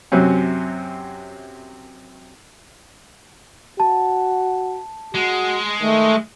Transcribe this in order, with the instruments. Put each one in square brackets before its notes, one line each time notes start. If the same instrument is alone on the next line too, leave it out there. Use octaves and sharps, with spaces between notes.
[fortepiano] F#2 C3 F#3 C4 C#4
[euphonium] F#4 [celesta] A5
[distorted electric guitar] G#3 [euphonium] F#4
[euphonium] D#3 [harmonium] A3